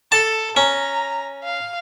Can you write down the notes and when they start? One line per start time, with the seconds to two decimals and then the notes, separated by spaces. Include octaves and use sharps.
0.12 A4 A5
0.57 C#4 A#5
1.44 F5